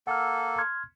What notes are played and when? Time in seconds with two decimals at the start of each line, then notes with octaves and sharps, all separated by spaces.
0.07 A#3 A4 F#5 E6 F6
0.58 C6 F6 G#6